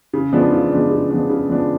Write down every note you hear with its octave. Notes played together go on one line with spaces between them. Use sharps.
C#3
F3 G#3 B3 D4
C#3
F3 G#3 B3 D4
C#3
F3 G#3 B3 D4
C#3
F3 G#3 B3 D4